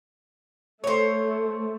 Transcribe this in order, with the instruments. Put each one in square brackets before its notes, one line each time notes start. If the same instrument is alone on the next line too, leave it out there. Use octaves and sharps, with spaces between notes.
[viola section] A3 [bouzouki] C5 C#5